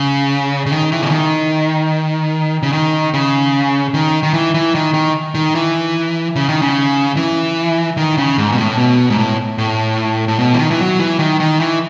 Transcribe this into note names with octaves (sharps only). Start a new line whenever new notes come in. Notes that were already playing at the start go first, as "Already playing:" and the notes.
Already playing: C#3
C#3
D#3
E3
C#3
D#3
C#3
D#3
C#3
D#3
D#3
E3
E3
D#3
D#3
D#3
E3
C#3
D#3
C#3
E3
D#3
C#3
G#2
B2
A2
B2
G#2
A2
A2
A2
B2
E3
D#3
E3
F#3
E3
D#3
D#3
E3